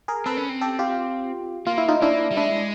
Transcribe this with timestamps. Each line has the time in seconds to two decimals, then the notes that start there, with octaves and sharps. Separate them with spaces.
0.08 G#4 A#4
0.26 C4 A4 B4
0.37 C#4
0.49 C4
0.61 G4 A4
0.79 F4 G4
1.67 A#3 F4
1.78 E4
1.88 D#4 F4
2.02 A#3 D4 E4
2.31 G3
2.37 G#3 D4 E4